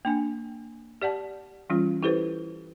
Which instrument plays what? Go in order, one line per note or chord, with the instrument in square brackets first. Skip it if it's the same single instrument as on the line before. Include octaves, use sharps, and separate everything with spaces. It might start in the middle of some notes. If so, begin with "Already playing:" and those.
[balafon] A#3 D4 G#5
G4 D5 F#5 A5
E3 G3 C#4 F4
E4 G4 A4 B4 C5